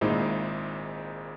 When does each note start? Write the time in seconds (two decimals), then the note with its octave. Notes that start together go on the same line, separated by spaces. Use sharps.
0.01 G#1 A#2 G#3 D#4 E4 C5